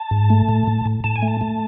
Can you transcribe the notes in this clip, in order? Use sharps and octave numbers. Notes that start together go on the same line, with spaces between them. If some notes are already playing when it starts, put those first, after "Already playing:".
Already playing: A5
G#2
A3
A2
A2
A2
A2 A5
G#5
A3
A5
A3